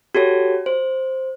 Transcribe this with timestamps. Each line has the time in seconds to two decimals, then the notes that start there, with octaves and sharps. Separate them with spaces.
0.15 F#4 G4 A4 C#5
0.66 C5